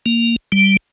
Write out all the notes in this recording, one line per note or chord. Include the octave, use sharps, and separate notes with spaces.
A#3
G3